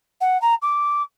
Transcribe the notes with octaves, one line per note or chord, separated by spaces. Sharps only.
F#5
A#5
D6